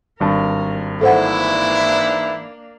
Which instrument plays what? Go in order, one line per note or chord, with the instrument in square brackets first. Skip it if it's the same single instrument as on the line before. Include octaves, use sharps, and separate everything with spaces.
[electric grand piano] G#1 G2 A5 [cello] A#4
[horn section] G#2 E3 E4 [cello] A#3 D4 [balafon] A4 C5 F#5